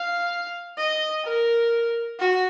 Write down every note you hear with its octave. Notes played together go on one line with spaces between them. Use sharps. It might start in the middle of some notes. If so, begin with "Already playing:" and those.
Already playing: F5
D#5
A#4
F#4